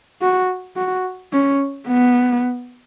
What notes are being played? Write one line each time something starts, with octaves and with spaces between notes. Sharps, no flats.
F#4
F#4
C#4
B3